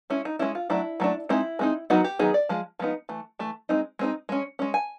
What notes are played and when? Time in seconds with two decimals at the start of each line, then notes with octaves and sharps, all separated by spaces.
0.10 G#3 C#4 E4
0.25 D#4
0.39 G#3 C#4 E4
0.55 F4
0.70 F#3 A3 D4 E4
1.00 F#3 A3 D4
1.29 G#3 C4 D#4 E4
1.59 G#3 C4 D#4
1.90 D#3 F#3 B3 D#4 F#4
2.04 G4
2.19 D#3 F#3 B3 D#4 G#4
2.34 D5
2.49 F3 G#3
2.79 F3 G#3 B3 D#4
3.09 E3 A3
3.39 E3 A3
3.69 G#3 C4 D#4
3.99 G#3 C4 D#4
4.29 G#3 C#4
4.59 G#3 C#4
4.74 G#5